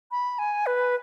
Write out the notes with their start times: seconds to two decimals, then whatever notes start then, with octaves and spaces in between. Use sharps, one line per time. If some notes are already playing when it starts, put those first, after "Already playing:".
0.11 B5
0.39 G#5
0.66 B4